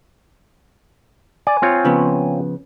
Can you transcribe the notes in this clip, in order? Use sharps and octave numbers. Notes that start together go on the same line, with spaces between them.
D5 G#5
C4 F4 C#5
C#3 F3 B3